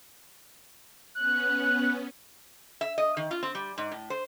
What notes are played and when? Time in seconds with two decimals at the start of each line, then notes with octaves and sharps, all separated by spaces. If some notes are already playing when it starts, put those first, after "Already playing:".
1.15 B3 C#4 F#6
2.81 E5
2.98 D#5
3.17 D#3
3.31 F4
3.43 C4
3.55 G3
3.78 G#2
3.92 A2
4.10 C5